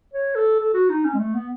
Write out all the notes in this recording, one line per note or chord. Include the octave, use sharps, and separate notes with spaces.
C#5
A4
A4
F#4
D#4
C#4
G#3
A3
B3